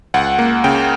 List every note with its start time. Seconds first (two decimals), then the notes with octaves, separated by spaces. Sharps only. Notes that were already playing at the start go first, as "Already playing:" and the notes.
0.14 C#2 F#5
0.38 A#3
0.64 C#3 G5